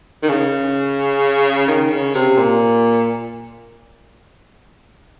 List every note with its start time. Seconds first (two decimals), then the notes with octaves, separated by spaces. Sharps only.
0.23 D#3
0.29 C#3
1.68 D#3
1.91 C#3
2.14 C3
2.37 A#2